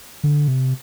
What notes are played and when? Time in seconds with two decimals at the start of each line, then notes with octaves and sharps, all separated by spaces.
0.24 D3
0.48 C3